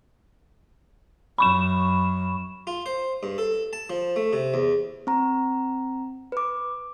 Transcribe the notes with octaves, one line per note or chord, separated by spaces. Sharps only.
F#2 B5 C#6 E7
F4
C5
G2
A4
A5
F3
A3
C3
E2
C4 A#5
B4 D6